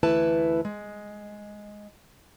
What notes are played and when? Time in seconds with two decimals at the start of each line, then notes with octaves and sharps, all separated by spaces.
0.03 D2 E3 A3 E4 B4 A5
0.65 G#3